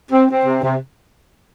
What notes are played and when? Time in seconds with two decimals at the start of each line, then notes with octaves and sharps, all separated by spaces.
0.11 C4
0.29 C4
0.46 C3
0.63 C3